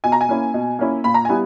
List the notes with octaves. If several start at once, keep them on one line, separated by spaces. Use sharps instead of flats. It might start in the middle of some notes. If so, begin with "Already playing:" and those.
B2 G#5
A#5
G#5
A#3 C#4 E4
B2
A#3 C#4 E4
A#2 B5
A#5
G3 B3 E4 G#5